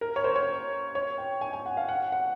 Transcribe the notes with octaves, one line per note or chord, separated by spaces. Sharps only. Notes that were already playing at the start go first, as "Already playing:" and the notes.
A#4
C#5
C5
C#5
C#5
G5
G#5
G#5
F#5
F5
F#5
F#5